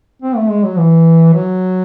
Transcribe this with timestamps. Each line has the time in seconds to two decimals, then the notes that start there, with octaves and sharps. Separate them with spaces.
0.22 C4
0.36 A3
0.50 G#3
0.64 F#3
0.78 E3
1.34 F#3